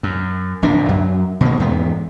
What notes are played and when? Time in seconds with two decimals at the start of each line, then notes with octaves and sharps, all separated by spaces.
0.03 F#2
0.62 D1 A#1 A#2 D4
0.89 F#2 F#3
1.41 B2 D#3 A#3
1.60 E2 G#2 B3